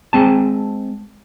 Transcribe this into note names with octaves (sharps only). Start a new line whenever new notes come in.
G#3 C4 A5